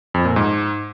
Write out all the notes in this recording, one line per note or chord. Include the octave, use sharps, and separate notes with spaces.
F2
A#2
G#2